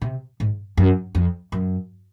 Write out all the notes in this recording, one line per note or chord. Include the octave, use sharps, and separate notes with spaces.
C3
G#2
F#2
F2
F#2